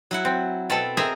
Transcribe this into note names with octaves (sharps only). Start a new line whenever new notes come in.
F#3 E4 F#5
C4
B2 C4 A4 A5 B5
C4 G#4 A#4 D#5 E5 A#5